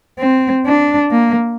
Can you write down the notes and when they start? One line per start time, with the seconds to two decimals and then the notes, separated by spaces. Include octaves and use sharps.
0.19 C4
0.66 D4
1.11 A#3